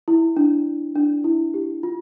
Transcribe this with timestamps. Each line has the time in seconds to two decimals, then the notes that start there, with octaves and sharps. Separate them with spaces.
0.08 E4
0.37 D4
0.96 D4
1.24 E4
1.54 G4
1.83 F4